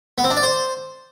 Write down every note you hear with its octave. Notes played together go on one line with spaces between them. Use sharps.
B3
C4
D4
D5
C5